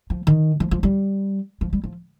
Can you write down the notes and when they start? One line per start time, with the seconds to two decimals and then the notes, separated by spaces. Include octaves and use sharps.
0.10 F3
0.27 D#3
0.60 F3
0.71 F3
0.83 G3
1.61 F3
1.73 G3
1.84 F3